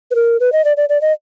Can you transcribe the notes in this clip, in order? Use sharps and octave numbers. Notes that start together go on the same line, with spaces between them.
B4
A#4
B4
D#5
D5
D5
D5
D#5